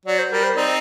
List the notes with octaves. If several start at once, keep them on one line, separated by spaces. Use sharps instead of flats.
F#3 D5
C5
G3 A#4
C5
C4 D#4 D5